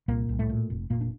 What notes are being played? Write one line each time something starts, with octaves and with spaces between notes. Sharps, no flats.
C2 A#2 A#3
C2
A2 A3
A#2
F1
F1 A#2 A#3
D4